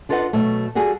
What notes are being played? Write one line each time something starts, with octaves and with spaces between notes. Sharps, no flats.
D4 F4 A4 B4 D#5 F#5
B2 F#3 A3
G3 F#4 G#4 A4